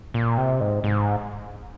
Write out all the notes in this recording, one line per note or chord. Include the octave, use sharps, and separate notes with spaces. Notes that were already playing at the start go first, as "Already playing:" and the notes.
A#2
C3
G#2
G#2